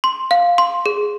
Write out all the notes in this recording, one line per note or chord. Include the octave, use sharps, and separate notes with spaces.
C6
F5
C6
G#4